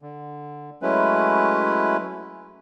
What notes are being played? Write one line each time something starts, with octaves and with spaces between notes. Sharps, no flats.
D3
F#3 G#3 A3 C#4 E4 B4